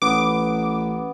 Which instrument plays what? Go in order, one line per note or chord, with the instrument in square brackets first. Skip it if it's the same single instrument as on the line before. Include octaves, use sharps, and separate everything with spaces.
[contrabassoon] A1 [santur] B3 [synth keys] D6